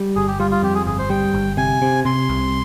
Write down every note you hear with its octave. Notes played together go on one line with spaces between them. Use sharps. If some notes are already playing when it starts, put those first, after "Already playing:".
Already playing: G3
G1 G#4
G4
G3 F4
F4
F2 G4
G#4
G1 G#4
C5
G3 G5
G1
C3 G#5
C3
C3 C6
C2